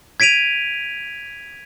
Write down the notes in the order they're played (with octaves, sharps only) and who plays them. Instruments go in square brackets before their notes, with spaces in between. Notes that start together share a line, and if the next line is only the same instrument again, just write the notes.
[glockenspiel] G#6 B6 D7 D#7 F7